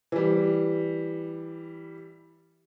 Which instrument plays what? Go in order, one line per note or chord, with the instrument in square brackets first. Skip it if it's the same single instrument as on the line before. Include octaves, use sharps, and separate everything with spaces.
[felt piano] E3 G3